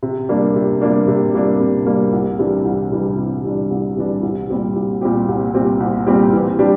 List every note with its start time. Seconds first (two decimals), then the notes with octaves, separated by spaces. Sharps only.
0.03 C3
0.29 G3 A#3 D4
0.55 C3
0.81 G3 A#3 D4
1.08 C3
1.34 G3 A#3 D4
1.60 C3
1.86 G3 A#3 D4
2.13 C2
2.39 C3 E3 G3 D4
2.65 C2
2.92 C3 E3 G3 D4
3.18 C2
3.44 C3 E3 G3 D4
3.71 C2
3.96 C3 E3 G3 D4
4.22 C2
4.49 A#2 G3 C4 G4
4.76 C2
5.01 A#2 G3 C4 G4
5.28 C2
5.54 A#2 G3 C4 G4
5.80 C2
6.06 A#2 G3 C4 G4
6.33 E3
6.59 G3 D4 G4